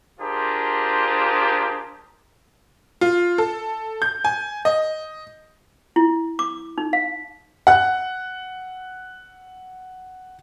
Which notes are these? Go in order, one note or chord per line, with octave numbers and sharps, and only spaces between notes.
D4 F4 G4 G#4 A#4 C5
F4
A4
G6
G#5
D#5
E4
D6
D#4
F5
F#5 F#6